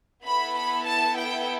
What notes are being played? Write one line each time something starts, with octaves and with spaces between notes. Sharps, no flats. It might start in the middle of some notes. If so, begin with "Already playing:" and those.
B3 E4 A4 B5
B5
A5
G5